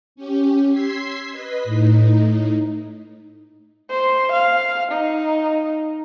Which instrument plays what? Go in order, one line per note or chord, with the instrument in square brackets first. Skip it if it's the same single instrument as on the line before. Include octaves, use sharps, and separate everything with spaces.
[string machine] C#4 G4
C6 E6 G#6 B6 C7
B4 D#5 B6
A2 D#4
[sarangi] C5
F5
D#4